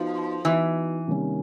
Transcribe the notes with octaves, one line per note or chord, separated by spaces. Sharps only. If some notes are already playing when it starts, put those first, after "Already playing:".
Already playing: F3 B3 D#4 F#4 B4
E3 B3 D#4 F#4 B4
C3 D#3 G3 A#3 C#4